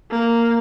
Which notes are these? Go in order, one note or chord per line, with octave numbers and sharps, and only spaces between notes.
A#3